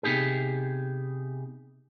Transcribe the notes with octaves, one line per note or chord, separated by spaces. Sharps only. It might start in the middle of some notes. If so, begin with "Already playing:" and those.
C3 B3 D#4 G4 G#4